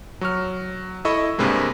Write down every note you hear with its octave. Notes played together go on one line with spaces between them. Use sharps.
F#3 C#6 F6
E4 A4 D#5 B5 C#6
G2 C3 G3 G#3 A#3